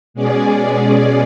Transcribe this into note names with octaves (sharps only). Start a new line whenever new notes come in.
B2 G#3 C#4 G#4 D5